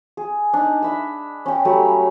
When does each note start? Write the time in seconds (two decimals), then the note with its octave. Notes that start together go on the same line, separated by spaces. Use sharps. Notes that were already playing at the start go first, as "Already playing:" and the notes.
0.17 G#4
0.53 D4 D#4
0.82 E5 B5 E6
1.46 C#4 G5
1.65 F#3 G3 A3 B5